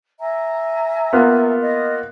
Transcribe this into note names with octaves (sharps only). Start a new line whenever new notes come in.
E5 G#5 A#5
A#3 B3 F4
D#5